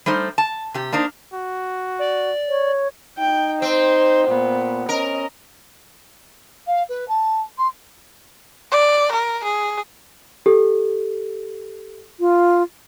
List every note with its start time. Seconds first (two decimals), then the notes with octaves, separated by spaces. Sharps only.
0.06 G3 A3 D#4 C5
0.38 A5
0.74 C3 G4
0.92 A#3 D4 D#4 C5
1.33 F#4
1.99 D5
2.48 C#5
3.18 D#4 G5
3.62 C4 C5
4.27 A#2 B3
4.89 C#4 A#4 D#5
6.66 F5
6.89 B4
7.08 A5
7.58 C6
8.71 D5
9.12 A#4
9.44 G#4
10.46 G4 A4
12.20 F4